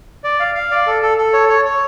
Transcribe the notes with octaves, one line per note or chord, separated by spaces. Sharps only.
D5
F5
F5
D5
A4
A4
A4
C#5
C#5
C#5